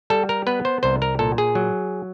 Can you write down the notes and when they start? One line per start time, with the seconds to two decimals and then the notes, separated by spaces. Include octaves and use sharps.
0.10 G3 A4
0.29 A#4
0.47 B3 B4
0.65 C5
0.83 C2 C5
1.02 A#4
1.19 A#2 A4
1.38 G#4
1.55 F#3